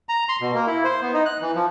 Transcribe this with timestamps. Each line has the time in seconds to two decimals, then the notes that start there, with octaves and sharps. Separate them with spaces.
0.09 A#5
0.29 C6
0.41 B2
0.54 A#3
0.67 E4
0.84 C5
1.02 B3
1.13 D#4
1.26 F#6
1.41 E3
1.55 F3